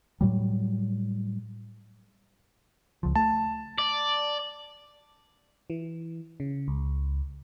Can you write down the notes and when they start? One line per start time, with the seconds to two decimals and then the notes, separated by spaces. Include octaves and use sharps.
0.21 A2 F#3 G3
3.03 C#2 F3
3.15 A3 A5
3.78 D5
5.70 E3
6.40 C#3
6.68 C#2